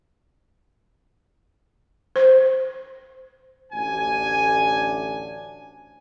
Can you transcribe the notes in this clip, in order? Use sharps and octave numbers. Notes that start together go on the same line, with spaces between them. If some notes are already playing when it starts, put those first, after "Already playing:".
C5
A1 D2 D4 G#5